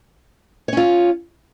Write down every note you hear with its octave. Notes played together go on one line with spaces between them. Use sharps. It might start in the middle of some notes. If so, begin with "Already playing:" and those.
C#4 F4 C#5